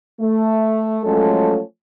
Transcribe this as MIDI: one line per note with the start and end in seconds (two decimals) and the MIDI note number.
0.20 1.00 57
1.04 1.60 53
1.04 1.60 54
1.04 1.60 56
1.04 1.60 57
1.04 1.60 61
1.04 1.60 69